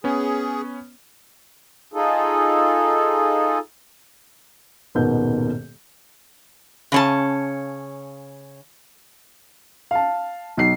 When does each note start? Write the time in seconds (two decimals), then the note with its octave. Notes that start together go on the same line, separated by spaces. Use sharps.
0.04 B3 C#4 G#4
1.93 D#4 F4 G#4 A4
4.95 D#1 G#2 B2 A#3 B3 G6
6.92 C#3 C#4 A5
9.91 F5 A5
10.57 B1 C7